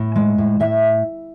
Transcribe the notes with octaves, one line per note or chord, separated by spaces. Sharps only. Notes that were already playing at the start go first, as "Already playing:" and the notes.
Already playing: A2
G#3
A2
A2 E5